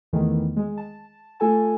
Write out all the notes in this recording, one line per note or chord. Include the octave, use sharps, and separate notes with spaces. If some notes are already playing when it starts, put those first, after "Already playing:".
E2 D#3 E3 A3
G#3
A5
A3 F4 A4 G#5 A5